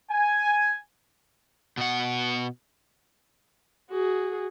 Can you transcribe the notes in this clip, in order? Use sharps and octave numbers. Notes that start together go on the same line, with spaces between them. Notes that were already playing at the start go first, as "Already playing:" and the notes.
G#5
B2 F#5
F#4 G#4